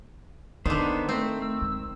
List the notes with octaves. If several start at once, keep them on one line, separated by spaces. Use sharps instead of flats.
D3 D#3 B3 D4 D#4 C5
A3 C4
E6
G#3